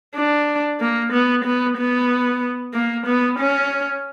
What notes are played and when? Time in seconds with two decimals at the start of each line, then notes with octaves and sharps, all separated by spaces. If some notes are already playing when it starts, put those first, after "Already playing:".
0.15 D4
0.80 A#3
1.12 B3
1.44 B3
1.77 B3
2.74 A#3
3.06 B3
3.39 C#4